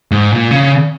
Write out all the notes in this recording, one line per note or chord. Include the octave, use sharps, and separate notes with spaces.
G#2
A#2
C#3